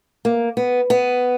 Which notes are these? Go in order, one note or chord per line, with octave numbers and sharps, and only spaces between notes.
A#3
B3
B3